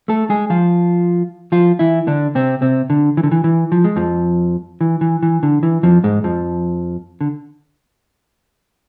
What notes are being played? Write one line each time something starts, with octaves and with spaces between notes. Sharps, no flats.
A3 A4
G#3 G#4
F3 F4
F3 F4
E3 E4
D3 D4
C3 C4
C3 C4
D3
E3
D3
E3
E3
F3
G#3
F2 F3
E3
E3
E3
D3
E3
F2 F3
G#2 G#3
F2 F3
D3